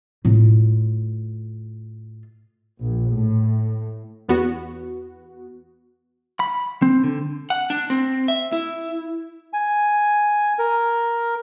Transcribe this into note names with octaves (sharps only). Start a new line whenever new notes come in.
A2 F4
A#1
A2
E2 B3 F#4
B5
C4
D3
F#5
D4
C4
E5
E4
G#5
A#4